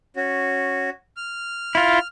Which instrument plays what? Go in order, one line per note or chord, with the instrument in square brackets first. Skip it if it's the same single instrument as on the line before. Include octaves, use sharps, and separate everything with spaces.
[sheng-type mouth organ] C#4 F#4
F6
[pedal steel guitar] E4 F4